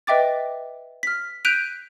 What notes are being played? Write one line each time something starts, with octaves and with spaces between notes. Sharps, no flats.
B4 D#5 E5 G5 D6 A6
F6 B6
F#6 G6 B6 D7 D#7 F7